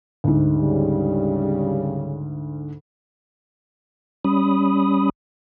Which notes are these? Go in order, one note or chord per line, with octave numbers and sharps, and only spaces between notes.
D2 G#2
C#3 G3
G3 C#4 B5 D#6